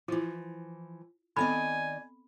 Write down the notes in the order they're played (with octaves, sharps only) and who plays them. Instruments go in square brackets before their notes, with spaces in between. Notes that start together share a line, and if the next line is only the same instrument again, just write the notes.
[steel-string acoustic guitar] E3 F3 [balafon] E4 F4
[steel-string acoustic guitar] D#3 D5 D#5 [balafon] B3 C4 A4 [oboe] G#5 [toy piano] B5